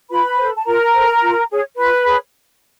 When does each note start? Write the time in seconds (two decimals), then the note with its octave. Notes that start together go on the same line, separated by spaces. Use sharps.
0.10 F4 B4 B5
0.38 A4 C5
0.56 A5
0.66 F4 A#4 A#5
0.94 A4 C5
1.22 F4
1.50 G#4 C#5
1.77 F4 B4 B5
2.05 G#4 C#5